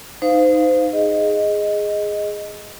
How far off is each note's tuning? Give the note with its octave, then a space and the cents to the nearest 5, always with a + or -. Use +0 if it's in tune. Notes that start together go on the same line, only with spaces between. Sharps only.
D#4 +0 C5 -30 F5 +0
G#4 +0 D#5 +0